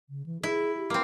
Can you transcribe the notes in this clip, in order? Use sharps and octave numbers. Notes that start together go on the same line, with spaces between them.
C#3
E3
E4 G#4
G4
A#3 C4